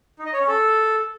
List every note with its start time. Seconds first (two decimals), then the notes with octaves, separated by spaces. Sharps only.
0.19 D#4
0.26 D#5
0.33 C#5
0.40 C#4
0.48 A4